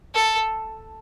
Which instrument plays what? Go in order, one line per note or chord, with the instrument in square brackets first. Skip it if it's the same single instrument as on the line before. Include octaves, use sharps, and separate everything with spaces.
[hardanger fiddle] A4